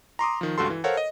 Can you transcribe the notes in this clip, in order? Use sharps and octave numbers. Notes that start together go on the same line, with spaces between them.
A#5 C6 D6 D#6
D#3 F3
C#2 G2 F#4 A4 C6
E3
A4 A#4 C5 C#5 F5 F#5
D#5